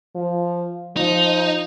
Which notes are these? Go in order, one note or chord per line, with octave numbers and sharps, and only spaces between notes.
F3
F3 D#4